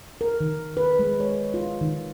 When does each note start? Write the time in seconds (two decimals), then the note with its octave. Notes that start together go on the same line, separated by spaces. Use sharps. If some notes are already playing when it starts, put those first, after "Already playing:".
0.21 A#4
0.40 D#3
0.77 B4
0.99 G#3
1.20 C#5
1.54 F4
1.82 D#3